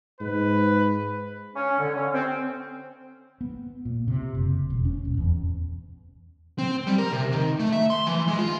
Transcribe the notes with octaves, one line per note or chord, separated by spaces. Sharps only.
G#2 B4
C#4
D3
C#4
C4
B3
A#2
C3
F#1
E1
C#4
D#1
E2
C4
G3
A#4
C3
D#3
A3
E5
C6
E3
G#3
F4